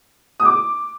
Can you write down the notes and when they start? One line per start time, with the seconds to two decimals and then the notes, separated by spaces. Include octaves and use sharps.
0.40 D#6
0.45 D6